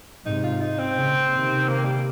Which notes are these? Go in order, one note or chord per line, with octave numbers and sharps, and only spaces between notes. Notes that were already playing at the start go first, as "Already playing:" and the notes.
G#2 C3 D#4
F4
D#4
C4
A#2 C#3
C3 D#3
A#3
G3